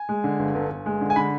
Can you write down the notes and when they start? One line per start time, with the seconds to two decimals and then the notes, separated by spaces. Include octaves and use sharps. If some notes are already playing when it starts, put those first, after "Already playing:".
Already playing: G#5
0.09 G#3
0.24 D3
0.39 G1
0.55 G1
0.70 G1
0.86 G#3
1.01 D3
1.10 G#5
1.16 D3 B5